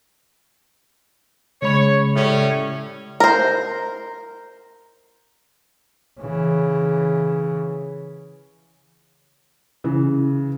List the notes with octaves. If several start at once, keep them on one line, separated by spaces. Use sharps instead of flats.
C#3 G#3 C#5 B5
A2 G3 C#4
A#4 C5
C#3 E3
C#3 E3